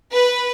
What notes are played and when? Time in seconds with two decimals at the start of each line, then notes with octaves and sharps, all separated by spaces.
0.13 B4